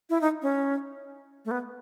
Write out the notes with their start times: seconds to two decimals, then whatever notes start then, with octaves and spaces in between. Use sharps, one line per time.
0.10 E4
0.21 D#4
0.42 C#4
1.45 A3
1.51 B3